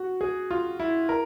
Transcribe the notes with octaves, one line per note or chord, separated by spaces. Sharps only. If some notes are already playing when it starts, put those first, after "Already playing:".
Already playing: F#4
G#4
F4
E4
A#4